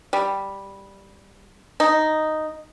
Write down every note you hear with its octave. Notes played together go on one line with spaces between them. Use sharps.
G3
D#4